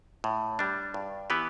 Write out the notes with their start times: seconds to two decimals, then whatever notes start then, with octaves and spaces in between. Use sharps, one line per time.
0.24 A2
0.59 G3 D4
0.94 G2
1.30 E3 B3 G4 B4